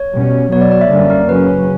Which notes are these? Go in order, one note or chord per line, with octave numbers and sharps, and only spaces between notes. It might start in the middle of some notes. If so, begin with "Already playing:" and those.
Already playing: C#5
B2 G3 C#4
B2 F#3 B3 C#5
D5
D5
E5
F#2 D3 G3 A#3 C#4 D5
A#4
C#3 F#3 C#4 B4